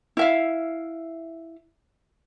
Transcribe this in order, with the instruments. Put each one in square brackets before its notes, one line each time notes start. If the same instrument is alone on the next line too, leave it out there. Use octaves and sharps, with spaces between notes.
[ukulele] E4 E5 F5